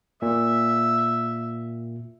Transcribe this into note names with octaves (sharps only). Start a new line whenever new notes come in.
A#2 E5